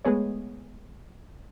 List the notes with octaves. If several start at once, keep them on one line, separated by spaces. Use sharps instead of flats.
G#3 A3 B3 G#4 C#5